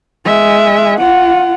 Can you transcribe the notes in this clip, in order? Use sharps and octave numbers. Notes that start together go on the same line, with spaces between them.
G#3 E5
F4 F#5